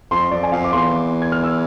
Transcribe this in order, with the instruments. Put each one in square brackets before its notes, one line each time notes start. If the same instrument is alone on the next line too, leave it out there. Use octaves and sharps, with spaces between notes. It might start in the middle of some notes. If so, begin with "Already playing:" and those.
[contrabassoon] F2 [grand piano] C6
[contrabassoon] F2 [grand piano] D5
[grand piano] G#5
[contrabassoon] F2 [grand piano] F5
[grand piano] D6
[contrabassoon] E2 [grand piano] C6
[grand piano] G#6
F6
E6